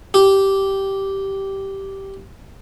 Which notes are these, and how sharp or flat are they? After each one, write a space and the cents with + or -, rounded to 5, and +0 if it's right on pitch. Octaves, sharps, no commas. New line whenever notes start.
G4 -10